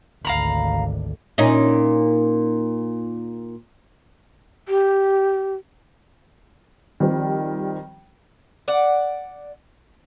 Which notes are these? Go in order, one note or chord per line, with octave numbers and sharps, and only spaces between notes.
G#1 D2 F5 A#5 B5
A#2 C#4 D#4
G4
D#3 F3 G3 C4
D5 F#5